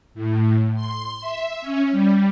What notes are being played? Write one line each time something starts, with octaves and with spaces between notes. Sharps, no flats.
A2
C6
E5
C#4
G3